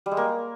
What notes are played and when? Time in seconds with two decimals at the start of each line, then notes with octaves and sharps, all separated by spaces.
0.06 G3
0.11 G#3
0.17 A#3